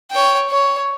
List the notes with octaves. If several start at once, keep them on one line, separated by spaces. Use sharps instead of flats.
C#5 G5
C#5